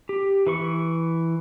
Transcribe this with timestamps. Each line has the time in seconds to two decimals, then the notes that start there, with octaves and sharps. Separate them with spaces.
0.09 G4
0.47 E3 B4 C#6